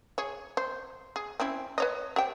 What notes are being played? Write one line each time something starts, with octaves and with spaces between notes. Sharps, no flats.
G#4 C#5
C5
G#4
C4 C#4 E4
B4 C#5 D#5
G4 C5 G5